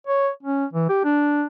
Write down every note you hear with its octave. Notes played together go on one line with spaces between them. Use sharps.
C#5
C#4
E3
G4
D4